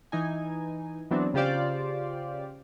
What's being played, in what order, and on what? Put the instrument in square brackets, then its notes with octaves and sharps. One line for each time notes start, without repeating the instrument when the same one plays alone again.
[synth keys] E3 D#4 G#5
E3 F#3 B3 C4 D4
C#3 F4 G4 C5 D5 F5